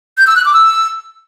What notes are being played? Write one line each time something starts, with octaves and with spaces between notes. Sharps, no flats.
G6
E6
F#6
D6
E6